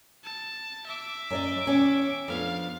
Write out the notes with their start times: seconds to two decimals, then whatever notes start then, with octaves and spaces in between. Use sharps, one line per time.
0.24 A5
0.86 E5 D6
1.30 F#2 D5 D#5
1.66 E2 C#4 G5
2.28 F2 B3 D4 F5